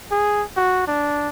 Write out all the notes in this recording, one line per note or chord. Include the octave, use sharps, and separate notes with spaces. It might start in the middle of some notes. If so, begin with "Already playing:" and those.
G#4
F#4
D4